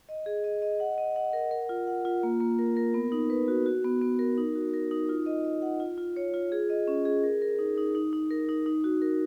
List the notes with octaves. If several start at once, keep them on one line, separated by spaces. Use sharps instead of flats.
D#5
G#4
D#5
D#5
F#5
D#5
F#5
A#4
A#4
F4
F#5
F4
A#3
A#3
A#4
A#4
B3
D#4
B4
F#4
F#4
B3
B3
A#4
D#4
F#4
A#4
D#4
F4
D#5
D#5
F#5
F4
F4
C#5
F4
G#4
D#5
C#4
G#4
A#4
A#4
D#4
D#4
D#4
D#4
A#4
D#4
D#4
F#4
A#4